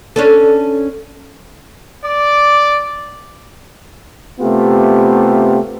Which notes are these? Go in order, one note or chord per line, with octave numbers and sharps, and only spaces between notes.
C#4 D4 A4
D5 D6
C3 A3 B3 F4 G4